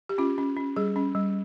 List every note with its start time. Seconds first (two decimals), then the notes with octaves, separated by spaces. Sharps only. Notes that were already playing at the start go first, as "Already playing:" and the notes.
0.09 G4
0.18 C#4 F4
0.38 C#4
0.57 C#4
0.76 G3 G#4
0.96 C#4
1.15 G3